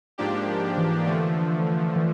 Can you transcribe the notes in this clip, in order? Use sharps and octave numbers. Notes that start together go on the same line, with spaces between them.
G#2 F3 A#3 D4 G4
E3
D3 F3 A3
E3